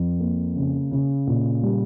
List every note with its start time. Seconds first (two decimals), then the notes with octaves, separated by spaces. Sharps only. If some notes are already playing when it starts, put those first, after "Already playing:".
Already playing: F2
0.20 A#3
0.56 C#3
0.91 C#3
1.27 A#2
1.63 G3